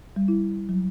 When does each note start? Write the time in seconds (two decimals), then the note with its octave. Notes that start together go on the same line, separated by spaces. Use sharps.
0.16 G3
0.28 E4
0.69 F#3